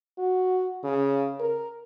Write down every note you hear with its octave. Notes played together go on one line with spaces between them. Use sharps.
F#4
C#3
A#4